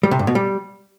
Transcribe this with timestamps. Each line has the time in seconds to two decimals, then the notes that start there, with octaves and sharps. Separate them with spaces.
0.03 G3
0.11 C3
0.19 G2
0.27 B2
0.35 G3